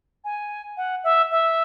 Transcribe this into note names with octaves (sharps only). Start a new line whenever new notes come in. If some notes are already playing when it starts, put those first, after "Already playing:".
G#5
F#5
E5
E5